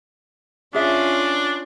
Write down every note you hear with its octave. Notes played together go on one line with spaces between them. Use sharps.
C#4 D4 F4 G#4 E5